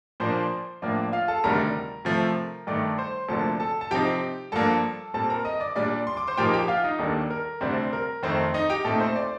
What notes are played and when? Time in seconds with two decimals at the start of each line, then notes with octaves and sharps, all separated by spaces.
0.20 A#2 F3 A#3 D4 C5 C6
0.82 A2 F3 A#3 D4 D5 D6
1.12 F4 F5
1.28 A4 A5
1.44 D2 C3 D#3 G3 D4 A#4 A#5
2.05 C3 F3 A3
2.67 G2 D#3 A3 D5 D6
2.98 C5 C6
3.28 D2 C3 F3 A#3 D4 A4 A5
3.60 A4 A5
3.81 A5
3.91 C3 F3 C4 D#4 G4 G5
4.52 G2 F3 A#3 D4 A4 A5
5.14 A#2 G3 C4 A4 A5
5.30 A#4 A#5
5.45 D#5 D#6
5.60 D5 D6
5.76 A#2 G3 D4 D5 D6
6.07 C6
6.17 D6
6.27 C5 C6
6.38 A#2 F3 A#3 D#4 G4 G5
6.54 G4 G5
6.68 F4 F5
6.84 D#4 D#5
6.99 D#2 D#3 G3 A#3 D4 A4
7.30 A#4
7.61 D2 C3 G3 C4 D4 C5
7.93 A#4
8.23 F2 D#3 A3 C4 C5
8.54 D#4 D#5
8.70 G4 G5
8.84 A#2 A3 C4 D#4 A4 A5
9.00 C5 C6
9.15 D5 D6